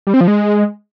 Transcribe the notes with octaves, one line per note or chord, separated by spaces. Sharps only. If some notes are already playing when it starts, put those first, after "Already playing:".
G3
C4
F3
G#3